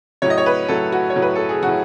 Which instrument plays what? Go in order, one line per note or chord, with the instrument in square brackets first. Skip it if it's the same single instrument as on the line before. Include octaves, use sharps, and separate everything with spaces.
[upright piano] A2 F#3 C#5
D#5
C#5
B4
A2 F#3 A4
F#4
C#5
A2 F#3
B4
A4
G#4
A2 F#3 F#4